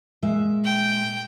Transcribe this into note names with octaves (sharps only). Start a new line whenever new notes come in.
A#2 G#3 E5
G5